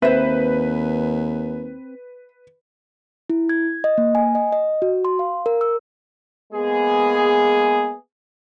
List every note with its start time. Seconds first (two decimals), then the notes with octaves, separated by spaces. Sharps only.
0.02 D#2 C4 B4 C5 E5
3.30 E4
3.49 G#6
3.84 D#5
3.98 A#3
4.15 G#5
4.35 D#5
4.52 D#5
4.82 F#4
5.05 C6
5.19 F5
5.46 A#4
5.61 E6
6.54 G#3 A#3 B3 G#4